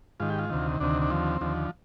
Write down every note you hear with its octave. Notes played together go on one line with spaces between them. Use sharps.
G#2 D#3 F4
G4
F4
D2 C3 D#3
D2 C3 D#3 D4
D4
D#2 D3 F3 C4
D#2 D3 F3